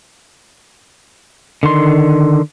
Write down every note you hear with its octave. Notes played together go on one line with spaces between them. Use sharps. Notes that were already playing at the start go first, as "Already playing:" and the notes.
D3 D#3 C6